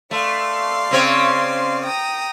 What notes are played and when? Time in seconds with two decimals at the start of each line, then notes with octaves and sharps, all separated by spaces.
0.11 A3 D5 F5 C6
0.91 C#3 C4 C#5
1.85 G5 A#5 D#6